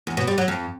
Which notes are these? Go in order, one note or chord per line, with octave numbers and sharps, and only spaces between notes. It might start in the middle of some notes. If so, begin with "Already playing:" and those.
E2
B2
G3
F#3
F2